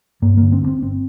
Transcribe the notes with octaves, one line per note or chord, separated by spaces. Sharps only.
G2 A#3
D3 A#3
C4
G2
C4
G1 C4